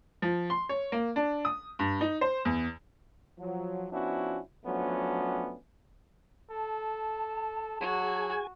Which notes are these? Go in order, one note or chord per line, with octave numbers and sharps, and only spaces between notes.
F3
C6
C#5
A#3
D4
D#6
G2
D#4
C5
E2
F3 F#3
F3 B3 C#4 D4 E4 F#4
F3 F#3 A3 B3 C#4 D4
A4 A5
F#3 F#4 G#4 G#5